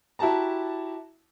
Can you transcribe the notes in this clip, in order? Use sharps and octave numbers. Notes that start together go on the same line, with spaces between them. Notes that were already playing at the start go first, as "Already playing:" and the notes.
E4 F#4 G4 A5 A#5